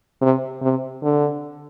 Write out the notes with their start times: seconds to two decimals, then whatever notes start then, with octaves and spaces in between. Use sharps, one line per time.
0.21 C3
0.62 C3
1.03 D3